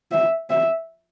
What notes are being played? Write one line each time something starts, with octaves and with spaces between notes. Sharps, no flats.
E5
E5